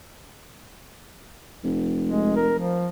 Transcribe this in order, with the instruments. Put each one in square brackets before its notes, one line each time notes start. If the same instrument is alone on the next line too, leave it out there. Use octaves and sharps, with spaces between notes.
[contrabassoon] F1
[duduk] G#3
A#4
F3